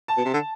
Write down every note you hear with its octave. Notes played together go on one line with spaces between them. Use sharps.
A5
B2
C3
D3